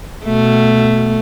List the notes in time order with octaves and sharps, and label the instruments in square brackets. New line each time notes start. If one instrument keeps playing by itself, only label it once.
[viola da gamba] B2 A3